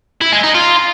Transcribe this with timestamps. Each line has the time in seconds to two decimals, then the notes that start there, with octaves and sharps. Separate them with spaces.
0.21 E4
0.32 G#3
0.43 D#4
0.55 F4